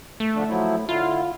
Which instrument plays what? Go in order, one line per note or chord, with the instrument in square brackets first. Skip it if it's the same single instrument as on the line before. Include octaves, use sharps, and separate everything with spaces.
[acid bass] A3
[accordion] D3 F3 D4
F3 F#3 E4
[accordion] D3 E4 [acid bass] F4